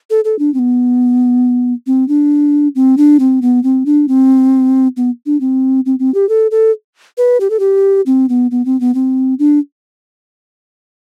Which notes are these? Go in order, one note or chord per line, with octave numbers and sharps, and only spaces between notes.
A4
A4
D4
C4
B3
C4
D4
C4
D4
C4
B3
C4
D4
C4
B3
D4
C4
C4
C4
G4
A4
A4
B4
G4
A4
G4
C4
B3
B3
C4
B3
C4
D4